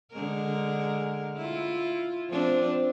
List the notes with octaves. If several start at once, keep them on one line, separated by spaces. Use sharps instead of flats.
D3 G#3 A#4
E4 F4
F3 C4 D4